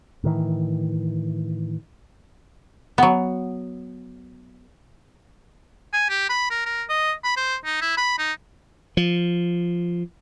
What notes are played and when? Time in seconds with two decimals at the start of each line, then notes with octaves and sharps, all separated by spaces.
0.24 A2 D#3 E3
2.98 F#3 B3
5.93 G#5
6.09 G4
6.29 B5
6.50 A#4
6.66 A#4
6.89 D#5
7.24 B5
7.37 C5
7.65 D#4
7.81 E4
7.97 B5
8.19 D#4
8.97 F3